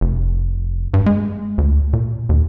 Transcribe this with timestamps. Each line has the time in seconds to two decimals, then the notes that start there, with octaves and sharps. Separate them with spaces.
0.01 F1
0.94 G2
1.06 G#3
1.58 D2
1.93 A#2
2.29 D#2